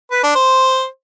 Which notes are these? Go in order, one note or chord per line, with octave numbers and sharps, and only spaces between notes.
B4
D4
C5